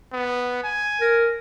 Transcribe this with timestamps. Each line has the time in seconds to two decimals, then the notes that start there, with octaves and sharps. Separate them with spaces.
0.13 B3
0.64 G#5
1.01 A#4